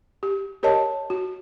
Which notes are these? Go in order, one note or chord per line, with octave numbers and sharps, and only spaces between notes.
G4
G4 A#4 C#5 D#5 A5
F#4